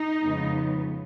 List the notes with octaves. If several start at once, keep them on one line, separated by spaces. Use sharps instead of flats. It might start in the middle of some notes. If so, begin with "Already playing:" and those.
Already playing: D#4
F2 C#3 G#3 B3